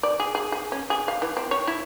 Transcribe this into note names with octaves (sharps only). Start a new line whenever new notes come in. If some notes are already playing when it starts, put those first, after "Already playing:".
D5
G#4
G#4
G#4
C#4
G#4
F5
E3
C4
C#5
E4